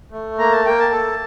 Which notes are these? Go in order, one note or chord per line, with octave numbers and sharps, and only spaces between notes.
A3
A#3 A#5
A5
A#3 G5
A5
A4